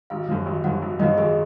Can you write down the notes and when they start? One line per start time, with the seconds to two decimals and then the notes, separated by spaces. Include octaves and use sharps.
0.10 G#1 F5
0.28 F#2 F3
0.46 G#1
0.64 F#2 F3 F#5
0.82 G#1
0.99 F#2 F3 D#5
1.18 G#1 G#4